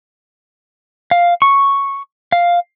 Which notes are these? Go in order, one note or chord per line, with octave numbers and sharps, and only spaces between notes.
F5
C#6
F5